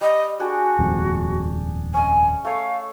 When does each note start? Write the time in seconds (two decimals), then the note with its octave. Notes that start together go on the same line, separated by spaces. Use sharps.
0.01 G3 D#5
0.40 D4 F#4 G#4 G5
0.79 D#1 F2 G#2
1.94 C#4 D#5 G#5
2.45 A3 C#5 F5